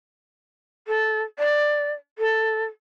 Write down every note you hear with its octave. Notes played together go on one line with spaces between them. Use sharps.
A4
D5
A4